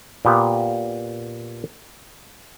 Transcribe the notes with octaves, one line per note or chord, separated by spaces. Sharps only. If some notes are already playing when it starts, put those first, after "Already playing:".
A#2 B3 G4